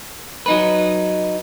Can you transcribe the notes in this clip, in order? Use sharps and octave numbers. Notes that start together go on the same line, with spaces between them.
F#3 D#4 B4